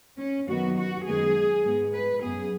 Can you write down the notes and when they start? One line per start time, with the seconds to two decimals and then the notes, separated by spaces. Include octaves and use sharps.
0.19 C#4
0.48 F#2 D#3 F#3 B3 F#4
0.77 F#4
1.07 F#2 D#3 G#3 B3 G#4
1.64 G#2 G#3 B3
1.94 B4
2.22 F#2 F#3 B3 G#4